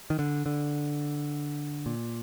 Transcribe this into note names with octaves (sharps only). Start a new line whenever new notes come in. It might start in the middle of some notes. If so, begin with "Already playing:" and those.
D#3
D3
D3
A#2